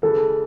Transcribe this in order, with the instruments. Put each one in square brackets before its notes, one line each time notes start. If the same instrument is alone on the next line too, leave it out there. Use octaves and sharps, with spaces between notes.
[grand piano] C#3 E3 G#3 [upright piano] A4